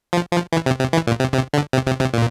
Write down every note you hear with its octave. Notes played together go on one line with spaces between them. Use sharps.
F3
F3
E3
C3
C3
E3
A#2
C3
C3
D3
C3
C3
C3
A#2